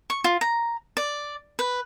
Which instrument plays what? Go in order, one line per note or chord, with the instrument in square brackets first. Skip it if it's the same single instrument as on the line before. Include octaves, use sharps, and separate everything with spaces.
[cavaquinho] C#6
F4
A#5
D5
B4